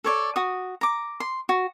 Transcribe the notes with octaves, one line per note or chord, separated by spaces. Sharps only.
A4 C#5 D5
F#4 D#6
A#5 D6
C6
F#4